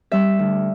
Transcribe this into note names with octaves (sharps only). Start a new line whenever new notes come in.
G3 E5
D2